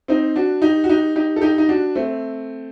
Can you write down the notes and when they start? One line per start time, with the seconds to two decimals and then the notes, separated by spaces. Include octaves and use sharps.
0.08 C4 D#4
0.36 D4 F#4
0.62 D#4 G4
0.84 F#4
0.89 D#4 G4
1.16 D#4 G4
1.36 A4
1.41 D#4 G4
1.58 D#4
1.69 D4 F#4
1.95 A3 C4